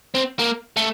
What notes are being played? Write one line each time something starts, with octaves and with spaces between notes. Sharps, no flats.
C4
A#3
A3